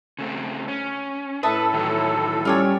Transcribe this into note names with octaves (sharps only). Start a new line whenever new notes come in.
C#3 A3 C4
C#4
A2 A4 B4 E5 A5 D#6
D#3 E3 F#3
G3 C#4 F4 G4 C#5